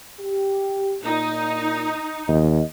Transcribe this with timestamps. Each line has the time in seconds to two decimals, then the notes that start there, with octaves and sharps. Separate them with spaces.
0.20 G4
1.04 A#2 D#4
2.28 D#2 D#5